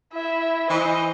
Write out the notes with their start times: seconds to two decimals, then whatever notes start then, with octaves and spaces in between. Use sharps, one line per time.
0.12 E4 E5
0.70 E3 C5 D#5